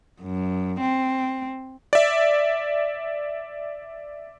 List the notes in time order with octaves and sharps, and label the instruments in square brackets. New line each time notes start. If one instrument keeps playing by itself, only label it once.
[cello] F#2
C4
[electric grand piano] D5 E5